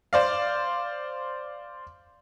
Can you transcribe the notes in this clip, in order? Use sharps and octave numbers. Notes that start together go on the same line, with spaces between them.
C5 D5 F5